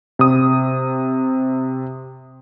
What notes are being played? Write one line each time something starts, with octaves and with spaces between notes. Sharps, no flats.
C3 D#6